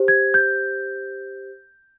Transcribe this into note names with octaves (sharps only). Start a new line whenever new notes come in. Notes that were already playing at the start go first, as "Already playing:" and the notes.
Already playing: G4 C5
G#6
G6